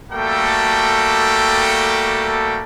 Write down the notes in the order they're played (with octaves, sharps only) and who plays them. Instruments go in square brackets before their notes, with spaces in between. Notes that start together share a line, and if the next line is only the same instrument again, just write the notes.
[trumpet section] G3 A3 A#3 F#4 A4 G5